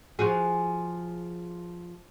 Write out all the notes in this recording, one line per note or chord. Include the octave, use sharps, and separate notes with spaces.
F3 F#4 G#4